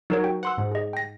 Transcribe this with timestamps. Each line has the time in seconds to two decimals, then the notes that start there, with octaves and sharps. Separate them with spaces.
0.10 F#3 D#4 A#4 C#5
0.24 F#4 G5
0.43 B4 F#5 C6 E6
0.58 G#2
0.71 G#4 D#5
0.93 G5 A#6